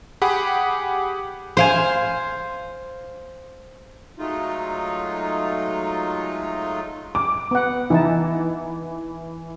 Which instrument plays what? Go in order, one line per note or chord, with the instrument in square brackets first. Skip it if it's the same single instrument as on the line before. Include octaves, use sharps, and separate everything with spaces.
[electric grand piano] G4 G#4 F#5 B5
[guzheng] C5 F5 G#5
[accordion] F#3 G#3 A3 D#4 F4
[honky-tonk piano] D6
[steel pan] B3 F#5
[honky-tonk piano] E3 [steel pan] D#4 E4 A5